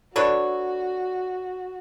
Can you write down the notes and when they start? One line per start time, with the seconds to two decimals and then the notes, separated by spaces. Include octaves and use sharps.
0.16 D4 F#4 A4 B4 C#5 D5